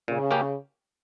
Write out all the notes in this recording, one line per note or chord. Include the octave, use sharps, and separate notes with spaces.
A#2 C#3
A#3 C#4 G4